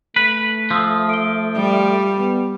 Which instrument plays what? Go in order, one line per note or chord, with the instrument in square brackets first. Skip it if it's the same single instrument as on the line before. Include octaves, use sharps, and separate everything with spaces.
[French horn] A3 [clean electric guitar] B4
[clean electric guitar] F3 [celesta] D#6 E6
[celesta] D7 G7
[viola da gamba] G3
[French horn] B3